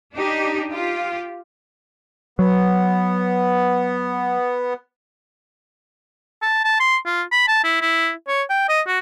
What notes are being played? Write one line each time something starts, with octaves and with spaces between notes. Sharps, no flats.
D4 D#4 G4
F4 G4
F#3 B3
A5
A5
C6
F4
B5
A5
E4
E4
C#5
G5
D#5
F#4